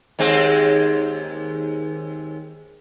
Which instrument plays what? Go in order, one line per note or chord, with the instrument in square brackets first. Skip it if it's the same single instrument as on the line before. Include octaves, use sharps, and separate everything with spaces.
[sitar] D#2 G#3 C4